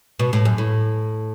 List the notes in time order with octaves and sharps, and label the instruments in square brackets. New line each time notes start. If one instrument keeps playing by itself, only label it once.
[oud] B2
A2
F#2
A2